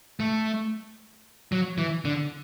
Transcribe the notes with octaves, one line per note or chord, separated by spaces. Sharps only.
A3
F#3
E3
D3